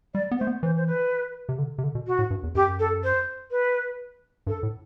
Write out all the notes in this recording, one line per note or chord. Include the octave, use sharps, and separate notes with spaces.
G3 D5
B3
A3 C5
B3
E3 C5
C5
B4
C3
D3
C3
D3
B2
F#4
A2
G2
E2
F#2 G4
A4
C5
B4
G2 A4
A2